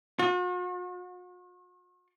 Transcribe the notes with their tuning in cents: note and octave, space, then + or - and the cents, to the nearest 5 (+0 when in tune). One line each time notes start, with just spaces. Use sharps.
F#4 -45